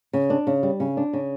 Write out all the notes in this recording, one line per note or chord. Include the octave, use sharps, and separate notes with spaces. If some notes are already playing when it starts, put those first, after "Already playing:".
C#3
D4
C#3
G3
C#3
D4
C#3